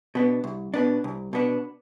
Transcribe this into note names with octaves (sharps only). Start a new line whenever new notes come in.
B2 B3 D4
C2
B2 B3 D4
C2
B2 B3 D4